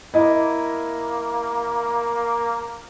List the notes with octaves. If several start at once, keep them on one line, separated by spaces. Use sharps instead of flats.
A#3 E4 D#5